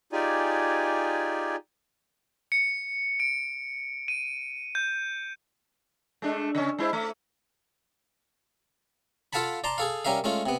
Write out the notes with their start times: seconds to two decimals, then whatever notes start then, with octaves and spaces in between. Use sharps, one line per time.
0.12 D#4 F4 G4 G#4 D5 G#5
2.52 C#7
3.20 D7
4.08 D#7
4.75 G6
6.22 G#3 A3 D4
6.55 C#3 C#4
6.78 G#3 E4 C5
6.93 A3
9.33 F4 A4 F5 F#5 A5 B5
9.64 D5 A5 A#5 C6
9.78 G#4 A4 F5
10.05 G3 C#4 A#4 E5 F5
10.24 G#3 A3 C#4 F4
10.46 C3 B3